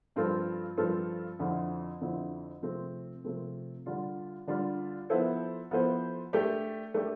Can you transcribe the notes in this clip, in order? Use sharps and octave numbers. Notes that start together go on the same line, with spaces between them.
G2 F3 C4 F4 A4
G2 F3 C4 F4 A4
F2 D3 F3 C4 E4
F2 D3 F3 C4 E4
C3 F3 A3 C4
C3 F3 A3 C4
D3 G3 D4 F4
D3 G3 D4 F4
F3 B3 E4 A4 C5
F3 B3 E4 A4 C5
A3 D4 G4
A3 D4 G4